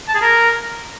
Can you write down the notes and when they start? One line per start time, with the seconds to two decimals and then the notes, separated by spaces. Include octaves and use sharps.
0.08 A5
0.15 G#4
0.21 A#4